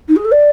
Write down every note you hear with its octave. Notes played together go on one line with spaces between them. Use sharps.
D#4
G#4
A4
D5